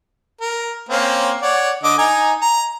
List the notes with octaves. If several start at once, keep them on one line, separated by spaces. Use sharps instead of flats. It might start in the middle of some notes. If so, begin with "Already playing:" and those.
A#4
A#3 C4 C#4
C#5 D5 F#5
D3 D#5 D6
D#4 G#5 A#5
A#5